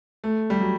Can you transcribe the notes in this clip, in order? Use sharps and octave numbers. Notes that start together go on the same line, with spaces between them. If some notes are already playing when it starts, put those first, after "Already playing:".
A3
G3
F#3